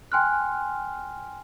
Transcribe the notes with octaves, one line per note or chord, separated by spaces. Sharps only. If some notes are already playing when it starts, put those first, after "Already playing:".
G5 G#5 C6 F6 F#6